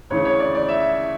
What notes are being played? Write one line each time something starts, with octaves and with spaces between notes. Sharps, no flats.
D2 C#3 E3 C#5
C#5
D5
D5
E5